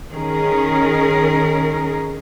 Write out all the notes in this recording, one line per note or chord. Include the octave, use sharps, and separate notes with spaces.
D#3 C#4 G#4 A#4